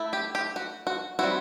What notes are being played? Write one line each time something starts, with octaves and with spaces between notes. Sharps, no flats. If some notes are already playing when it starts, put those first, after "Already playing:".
Already playing: A3 E4
G4
G4
F#4
F#4
G3 C4 E4 F#4